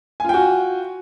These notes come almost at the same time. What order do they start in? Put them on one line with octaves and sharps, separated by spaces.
G#5 F4 G5 F#4